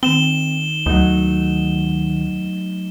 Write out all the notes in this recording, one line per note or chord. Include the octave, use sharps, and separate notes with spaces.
D#3 C4 E7 G7
D2 F#3 A3 D#4